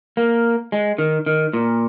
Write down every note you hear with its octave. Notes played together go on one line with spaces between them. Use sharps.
A#3
G#3
D#3
D#3
A#2